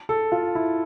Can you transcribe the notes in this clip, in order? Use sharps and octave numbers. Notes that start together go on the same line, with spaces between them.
A4
F4
E4